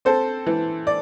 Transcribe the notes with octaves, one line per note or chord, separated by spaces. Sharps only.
C4 A4 C5
E3
D5